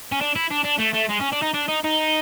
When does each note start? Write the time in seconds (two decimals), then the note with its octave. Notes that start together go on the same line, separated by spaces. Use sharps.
0.12 C#4
0.21 D4
0.36 E4
0.51 D4
0.65 D4
0.80 A3
0.94 A3
1.10 G#3
1.21 C#4
1.33 D4
1.43 D#4
1.54 D4
1.69 D#4
1.84 D#4